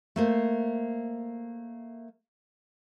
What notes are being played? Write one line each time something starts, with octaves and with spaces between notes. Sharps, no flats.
A3 A#3 C5